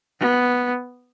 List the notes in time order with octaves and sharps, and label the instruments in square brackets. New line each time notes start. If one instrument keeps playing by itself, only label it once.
[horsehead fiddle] B3